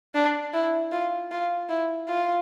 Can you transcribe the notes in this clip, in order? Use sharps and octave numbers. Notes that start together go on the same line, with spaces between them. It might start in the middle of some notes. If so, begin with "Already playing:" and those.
D4
E4
F4
F4
E4
F4